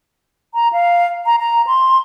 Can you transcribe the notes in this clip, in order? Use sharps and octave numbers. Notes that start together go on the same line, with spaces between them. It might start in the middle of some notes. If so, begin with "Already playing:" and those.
A#5
F5
A#5
A#5
C6